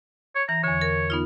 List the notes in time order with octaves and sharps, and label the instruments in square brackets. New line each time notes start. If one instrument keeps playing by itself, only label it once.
[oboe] C#5
[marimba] E3 [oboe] A#5
[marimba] E2 D3 [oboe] C#5
[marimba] A#4
B3 D#4 F4